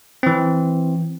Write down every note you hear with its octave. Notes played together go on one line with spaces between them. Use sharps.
E3 C4